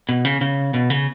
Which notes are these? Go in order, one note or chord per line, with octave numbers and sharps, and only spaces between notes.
B2
C#3
C#3
B2
C#3